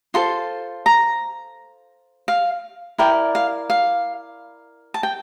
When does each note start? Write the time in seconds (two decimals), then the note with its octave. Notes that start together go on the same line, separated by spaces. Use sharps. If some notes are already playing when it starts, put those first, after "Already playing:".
0.14 F4 A4 C5 C6
0.86 A#5
2.28 F5
2.98 E4 A#4 D5 G5
3.35 F5
3.70 F5
4.94 A5
5.03 G5